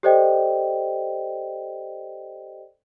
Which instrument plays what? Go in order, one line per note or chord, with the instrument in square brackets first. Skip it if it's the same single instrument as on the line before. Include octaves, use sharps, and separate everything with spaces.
[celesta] G4 A4 C5 D5 D#5 G5